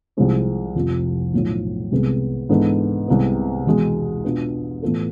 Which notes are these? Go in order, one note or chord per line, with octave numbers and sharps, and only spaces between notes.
C2 C3 F3 G#3 C4
F1 F2 C3 F3
B1 A2 F3
C2 C3 G#3 B3
G#2 E3 B3 D4 A4
C2 C3 G#3 B3
E1 E2 B2 G#3
B2 B3 D4 F4
A2 E3 B3 F4 A4